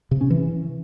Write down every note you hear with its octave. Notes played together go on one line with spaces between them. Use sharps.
C3
C#4
E3